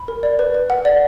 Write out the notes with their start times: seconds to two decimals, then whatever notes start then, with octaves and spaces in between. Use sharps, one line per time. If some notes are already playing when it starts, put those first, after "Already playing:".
Already playing: B5
0.08 A#4
0.23 D5
0.39 B4
0.54 B4
0.70 F#5
0.85 D5